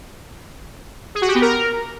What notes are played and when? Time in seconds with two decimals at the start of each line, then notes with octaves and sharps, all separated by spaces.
1.15 G#4
1.22 F#4
1.28 G4
1.35 B3
1.42 A#4